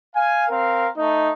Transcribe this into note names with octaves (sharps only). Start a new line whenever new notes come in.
F5 G#5
C4 A#4 F5
A3 D#4